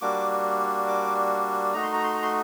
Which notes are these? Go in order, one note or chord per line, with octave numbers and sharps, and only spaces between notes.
G3 A#3 D4 F#4 D6
D6
A3 D#4 F#4 A#5
C6
A#5
C6
A#5
C6